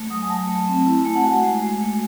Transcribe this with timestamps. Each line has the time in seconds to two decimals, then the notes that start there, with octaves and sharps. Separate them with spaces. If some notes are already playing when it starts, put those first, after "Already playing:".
Already playing: A3
0.10 F#3 D#6
0.22 G#5
0.29 F#3 A5
0.48 A3
0.68 C4
0.86 E4
1.01 A5
1.05 A3 G#5
1.15 F#5
1.24 F#4 G#5
1.43 G#3
1.62 G#3
1.81 A3